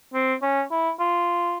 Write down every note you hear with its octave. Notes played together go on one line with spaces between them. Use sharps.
C4
C#4
E4
F4